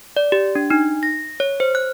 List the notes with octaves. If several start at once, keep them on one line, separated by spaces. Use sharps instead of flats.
D5
G4
D4
D#4
A#6
C#5
C5
F#6